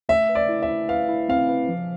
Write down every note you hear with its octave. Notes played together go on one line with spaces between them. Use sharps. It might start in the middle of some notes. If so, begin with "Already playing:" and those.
A3 E5
B4
D5
E4
E5
E4
B4 F5
E4
C4 F5
B4
F3